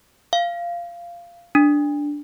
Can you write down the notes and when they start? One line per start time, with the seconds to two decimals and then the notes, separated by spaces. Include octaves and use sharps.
0.33 F5
1.55 D4